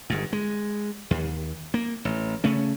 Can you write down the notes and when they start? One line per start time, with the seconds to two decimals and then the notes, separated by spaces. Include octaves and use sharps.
0.10 G1 G#2
0.33 G#3
1.11 D#2
1.74 A#3
2.05 A1
2.44 C#3 A3 C#4